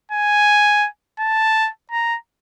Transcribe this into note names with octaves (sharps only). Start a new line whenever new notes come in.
G#5
A5
A#5